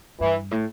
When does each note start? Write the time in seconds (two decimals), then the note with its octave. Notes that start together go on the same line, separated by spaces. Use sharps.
0.19 G2 E3
0.51 A2